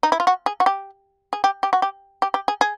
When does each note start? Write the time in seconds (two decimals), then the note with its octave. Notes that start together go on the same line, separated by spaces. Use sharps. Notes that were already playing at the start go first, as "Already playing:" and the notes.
0.03 D#4
0.12 E4
0.20 F4
0.27 F#4
0.46 G#4
0.60 F#4
0.66 G4
1.33 G#4
1.44 G4
1.63 G4
1.73 F#4
1.82 G4
2.22 G4
2.34 G4
2.48 G#4
2.61 G#4